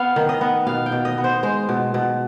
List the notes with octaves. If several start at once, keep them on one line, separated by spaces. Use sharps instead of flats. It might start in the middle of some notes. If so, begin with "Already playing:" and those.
Already playing: B3 F5
D#3
D#5
B3
B2 F5
G5
B2
D#5
B3
C5
G#3 C5
B2
B2